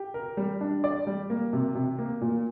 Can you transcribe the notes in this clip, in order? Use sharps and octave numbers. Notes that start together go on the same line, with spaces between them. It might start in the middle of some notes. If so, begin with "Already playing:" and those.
Already playing: G4
A#4
G3
D4
D5
G3
A#3
C3
C3
A#3
A#2